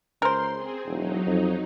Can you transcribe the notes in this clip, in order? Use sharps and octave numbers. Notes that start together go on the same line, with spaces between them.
C#2 A#4 C5 C6
C4 G#4
E1 F#3 D#4
F2